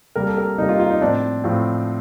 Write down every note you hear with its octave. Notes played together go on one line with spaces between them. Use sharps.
C3 G3 A#3 A#4
A4
A#4
C3 G3 A#3 D#4
F4
F4
D#4
A2 F3 C4 D4
A2 F3 C4